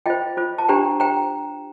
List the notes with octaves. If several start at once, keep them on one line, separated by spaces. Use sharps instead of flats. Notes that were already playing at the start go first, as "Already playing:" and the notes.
F4 C5 D#5 G5
F4 C5
A5
D4 G4 C5 G5 A#5
C5 G5 A#5